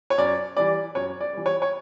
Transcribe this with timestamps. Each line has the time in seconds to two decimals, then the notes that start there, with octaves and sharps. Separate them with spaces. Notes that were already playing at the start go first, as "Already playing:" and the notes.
0.10 C#5
0.18 F#2 D5
0.57 E3 G3 D5
0.95 F#2 C#5
1.21 D5
1.33 E3 G3
1.46 C#5
1.62 C#5